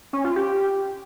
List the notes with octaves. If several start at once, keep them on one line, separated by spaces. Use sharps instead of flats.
C#4
F4
G4